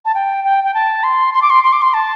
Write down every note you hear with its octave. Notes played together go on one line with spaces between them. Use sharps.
A5
G5
G5
G5
A5
C6
C6
D6
C6
C6
D6
C6
A5